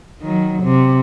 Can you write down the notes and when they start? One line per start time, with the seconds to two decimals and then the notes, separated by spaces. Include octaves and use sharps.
0.23 D#3 F#3
0.63 C3